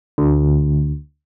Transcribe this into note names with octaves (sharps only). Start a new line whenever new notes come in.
D2